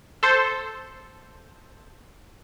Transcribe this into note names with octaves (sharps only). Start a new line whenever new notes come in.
A4 C5